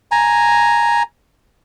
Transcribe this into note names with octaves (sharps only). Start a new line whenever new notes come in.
G#5 A#5